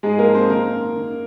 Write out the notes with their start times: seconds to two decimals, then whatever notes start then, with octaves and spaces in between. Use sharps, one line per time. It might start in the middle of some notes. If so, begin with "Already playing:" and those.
0.03 G#2 G#3 G#4
0.19 A#3 A#4
0.27 F3
0.34 C4 C5
0.50 D#3 A#3 A#4
0.73 F#2
0.96 D#3